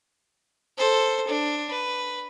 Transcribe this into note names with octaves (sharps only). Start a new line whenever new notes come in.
A4 C5
D4
B4